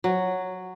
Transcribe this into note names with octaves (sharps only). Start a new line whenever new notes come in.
F#3